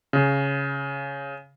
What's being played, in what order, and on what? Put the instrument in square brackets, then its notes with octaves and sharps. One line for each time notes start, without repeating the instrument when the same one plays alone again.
[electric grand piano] C#3